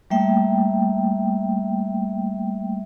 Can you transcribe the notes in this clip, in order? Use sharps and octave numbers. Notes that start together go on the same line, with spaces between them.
G3 A3 A#3 E5 G5